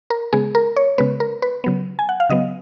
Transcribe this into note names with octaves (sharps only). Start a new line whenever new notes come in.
A#4
C#3 G#3 B3 G#4
A#4
C#5
C#3 G#3 B3 B4
A#4
B4
C#3 F#3 B3
G#5
F#5
F5
C#3 F#3 B3 D#5